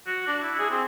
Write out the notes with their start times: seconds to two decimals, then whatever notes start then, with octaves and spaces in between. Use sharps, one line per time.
0.07 F#4
0.27 D4
0.42 E4
0.59 G#4
0.71 C4